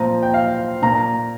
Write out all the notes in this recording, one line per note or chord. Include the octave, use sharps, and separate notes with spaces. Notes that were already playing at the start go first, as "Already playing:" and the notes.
Already playing: A#2 F3 C4 A#5
G5
F5
A#2 A#3 A#5